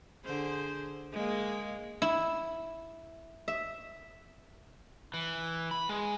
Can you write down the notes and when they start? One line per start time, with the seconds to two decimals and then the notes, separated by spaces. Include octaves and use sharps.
0.25 D3 G#4 C5
1.12 G#3 A#3
2.02 E4
3.48 E5
5.14 E3
5.71 B5
5.89 G#3